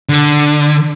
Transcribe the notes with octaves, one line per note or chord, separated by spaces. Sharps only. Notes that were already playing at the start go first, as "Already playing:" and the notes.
D3